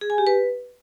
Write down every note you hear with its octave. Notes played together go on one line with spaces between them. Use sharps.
G#4
G#5
G4
B4